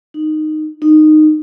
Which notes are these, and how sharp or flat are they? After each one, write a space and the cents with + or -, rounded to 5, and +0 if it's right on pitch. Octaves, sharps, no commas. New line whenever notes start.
D#4 -10
D#4 -15